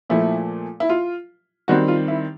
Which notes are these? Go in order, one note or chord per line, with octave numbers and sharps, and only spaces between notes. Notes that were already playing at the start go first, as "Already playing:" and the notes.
A#2 F3 A3 E4
E4
F4
D#3 G3 C4 F#4
F4
E4